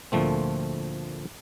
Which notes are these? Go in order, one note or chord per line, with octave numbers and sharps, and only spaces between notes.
D2 A#2 F3 A3 C4